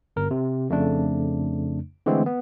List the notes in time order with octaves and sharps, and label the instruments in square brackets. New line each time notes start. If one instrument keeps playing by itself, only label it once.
[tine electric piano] G1 A#4
C3
F2 C#3 A3 D4
D3 E3 G#3 A3 C4
B3